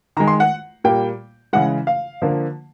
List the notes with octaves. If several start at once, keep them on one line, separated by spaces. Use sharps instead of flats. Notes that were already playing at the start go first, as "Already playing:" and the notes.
D#3 G#3 A#5
C6
F#5
A#2 G3 A#3 G5
C#3 E3 G#3 F#5
F5
D3 F3 A#3